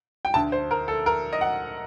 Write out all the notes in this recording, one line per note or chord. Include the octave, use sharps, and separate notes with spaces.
G5
D2 D3 A5
C5
A#4
A4
A#4
D#5
F#5